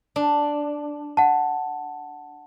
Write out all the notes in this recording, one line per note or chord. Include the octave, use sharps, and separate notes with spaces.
D4
F#5 A5